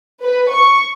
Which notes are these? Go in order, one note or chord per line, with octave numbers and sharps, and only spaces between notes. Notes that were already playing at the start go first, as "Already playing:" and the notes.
B4
C#6